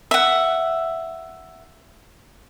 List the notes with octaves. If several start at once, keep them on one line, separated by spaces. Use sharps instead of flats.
E5 F#5